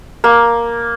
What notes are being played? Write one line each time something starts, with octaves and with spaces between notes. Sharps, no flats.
A#3